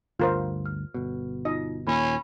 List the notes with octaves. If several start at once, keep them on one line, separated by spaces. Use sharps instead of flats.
G1 D2 G2 F4 A#4 C5
F6
G1 B2
D#4 F4 D#5
D#2 A#2 C#4 B5